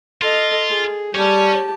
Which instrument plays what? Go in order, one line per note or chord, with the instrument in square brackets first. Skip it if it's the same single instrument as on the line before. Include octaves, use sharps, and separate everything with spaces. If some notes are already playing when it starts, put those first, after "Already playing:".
[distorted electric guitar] F4 [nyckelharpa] A4 D#5
[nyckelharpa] G#4
[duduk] G3 [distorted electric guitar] C#4 [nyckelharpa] G4 A5